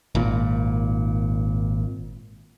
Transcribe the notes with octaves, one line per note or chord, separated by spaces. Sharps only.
G#1 A#2